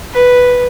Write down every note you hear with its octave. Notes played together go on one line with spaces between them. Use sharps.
B4